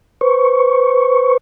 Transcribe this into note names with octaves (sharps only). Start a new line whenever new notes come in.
B4 C5 C#6